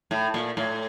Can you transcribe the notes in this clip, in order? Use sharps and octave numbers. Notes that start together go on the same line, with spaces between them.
A2
A#2
A2